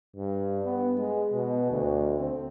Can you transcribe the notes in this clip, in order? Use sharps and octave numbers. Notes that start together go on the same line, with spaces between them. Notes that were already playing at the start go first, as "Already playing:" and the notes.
G2
B3
G#3
B2
D2
C4